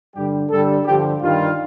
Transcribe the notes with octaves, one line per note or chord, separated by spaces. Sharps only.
G2 D3 G3 G4
G2 D3 G3 A4
G2 D3 F3 G4
G2 D#3 G3 F4